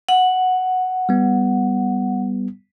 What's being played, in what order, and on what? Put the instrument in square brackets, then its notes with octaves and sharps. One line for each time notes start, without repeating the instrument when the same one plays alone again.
[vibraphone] F#5
[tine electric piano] G3 B3